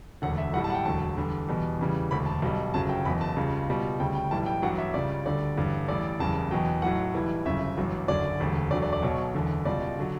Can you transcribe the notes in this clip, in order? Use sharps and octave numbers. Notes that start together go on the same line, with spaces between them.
E1 D2 D3 F#5
E5
B1 A2 G3 F#5
A5
F#5
G5
E1 D2 D3 F#3 A5
E2 D3 G3
E2 B2 G3
E2 C#3 E3 G3
E1 D2 D3 B5
A5
B1 B2 G3
G1 F#2 C#3 F#3 A5
G5
F#1 E2 B2 B5
A5
C#2 C#3 G3
C#2 B2 G3
D2 C#3 G3 G5
G5
B1 A2 E3 G3 A5
G5
A1 G2 F#3 F#5
E5
C#2 C#3 G3 D5
D2 D3 G3 D5
A1 G2 D3 G3
A1 A2 G3 D5
F#1 E2 C#3 G3 A5
E2 B2 F#3 G5
B1 A2 F#3 F#5
B1 A2 E3 G3
G1 F#2 C#3 E5
A1 G2 F#3
F#1 F#2 D3 F#3 D5
E1 D2 D3 G3
E1 D2 D3 F#3 D5
D5
D5
B1 B2 F#3 C#5
F#1 E2 D3
C#2 B2 G3 D5
D3 F#3